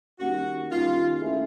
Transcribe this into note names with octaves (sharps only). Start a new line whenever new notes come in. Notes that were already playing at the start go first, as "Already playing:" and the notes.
D#3 G3 A#3 C#4 F#4
D#3 G3 A#3 C#4 F4
A3 C#4 E4 G#4